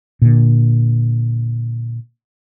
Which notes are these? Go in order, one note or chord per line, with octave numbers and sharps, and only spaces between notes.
A#2 D3